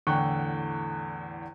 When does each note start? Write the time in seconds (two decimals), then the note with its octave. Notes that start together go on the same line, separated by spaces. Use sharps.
0.07 E2 A2 D3 G5 C#6 F#6